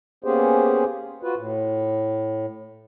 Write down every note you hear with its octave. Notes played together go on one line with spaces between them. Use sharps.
A#3 B3 C#4 G4 G#4 C5
F4 F#4 B4
A2